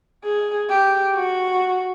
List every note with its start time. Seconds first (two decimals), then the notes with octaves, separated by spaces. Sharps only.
0.24 G#4
0.69 G4
1.15 F#4